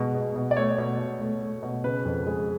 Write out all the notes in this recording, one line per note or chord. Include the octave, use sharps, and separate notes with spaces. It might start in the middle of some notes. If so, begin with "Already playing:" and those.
Already playing: B2 G#3
B2
B2
D5
A3 C#5
B2
B2
A3
A3
B2
C#3 B4
F2
G#3